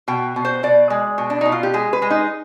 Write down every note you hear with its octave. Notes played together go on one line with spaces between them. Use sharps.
B2 G5
B2
C5
B2 D5
G#3
B2
D4
B2 D#4
F4
G4
G#3 G#4
B4
G#3
D#4